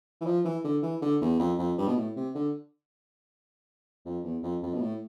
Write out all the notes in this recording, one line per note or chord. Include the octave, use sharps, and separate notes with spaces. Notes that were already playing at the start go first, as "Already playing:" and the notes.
E3
F3
E3
D3
E3
D3
E2
F2
F2
G2
B2
A2
C3
D3
F2
E2
F2
F2
B2
A2